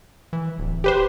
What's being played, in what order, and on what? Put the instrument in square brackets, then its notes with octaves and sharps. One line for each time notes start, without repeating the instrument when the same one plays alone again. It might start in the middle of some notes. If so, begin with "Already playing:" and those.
[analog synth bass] E3
D1
[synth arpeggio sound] G4 B4 C5